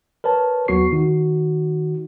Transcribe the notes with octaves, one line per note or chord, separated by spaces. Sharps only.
A#4 B4 C#5 A5
D#2 F#3 B3 F#4 C#6 C7
D#3 D#4 F#4